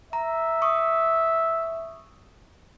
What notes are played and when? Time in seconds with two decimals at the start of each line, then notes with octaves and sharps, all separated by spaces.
0.13 E5 A#5
0.62 C#6 D#6